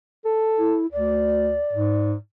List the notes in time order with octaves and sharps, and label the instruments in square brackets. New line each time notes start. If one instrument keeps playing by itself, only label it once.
[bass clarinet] A4
[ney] E4
[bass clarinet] D2 [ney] D5
[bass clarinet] G#2